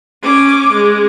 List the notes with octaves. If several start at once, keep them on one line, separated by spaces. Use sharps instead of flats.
C#4 D6
G#3